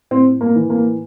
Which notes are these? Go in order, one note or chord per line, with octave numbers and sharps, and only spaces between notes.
A2 C4
A#3
E3
A#3